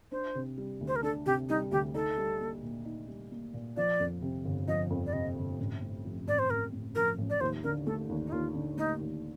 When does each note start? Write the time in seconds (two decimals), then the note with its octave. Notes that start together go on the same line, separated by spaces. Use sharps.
0.12 D4 C5
0.35 C3
0.58 G3
0.81 D2
0.88 C5
0.96 A#4
1.03 D4 A4
1.26 C3 G4
1.49 G3 D#4
1.71 D2 G4
1.94 D#4 A4
2.18 G3
2.40 A#3
2.63 A#2
2.85 D#4
3.08 G3
3.31 A#3
3.54 A#2
3.77 F3 D5
4.00 F2
4.22 C3
4.45 G1
4.68 F3 D#5
4.90 F2
5.06 D5
5.13 C3 D#5
5.36 G1
5.58 A1
5.82 A2
6.05 F3
6.27 A1 D5
6.39 C5
6.50 A1 A#4
6.73 A2
6.95 F3 A#4
7.18 A1
7.30 D5
7.41 D#2 C5
7.64 D3 A#4
7.87 A3 A4
8.09 D#2
8.27 D#4
8.32 D#2 F4
8.55 D3
8.77 A3 D#4
9.01 D#2